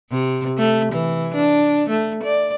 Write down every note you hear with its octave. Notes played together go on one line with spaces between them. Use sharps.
C3
A3
E3
D4
A3
D5